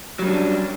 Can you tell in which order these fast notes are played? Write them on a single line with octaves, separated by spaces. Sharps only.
F#3 G3 C#4 D4